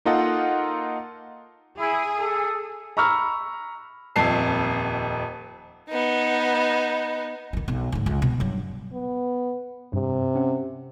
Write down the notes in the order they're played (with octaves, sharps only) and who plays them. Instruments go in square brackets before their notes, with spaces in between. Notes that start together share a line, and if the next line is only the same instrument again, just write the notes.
[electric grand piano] A#3 D#4 F4 A4 D#5 F#5
[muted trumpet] E4 [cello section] G#4
[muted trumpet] A4
[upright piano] A#5 B5 C#6 E6 F6
D#1 F2 A5 C7
[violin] B3 D#4
[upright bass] D#3 F#3
B1
D2 G#2
C#2
B2
G2 F#3
[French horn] B3
[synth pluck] G2 [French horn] C3
[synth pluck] C#4 F#5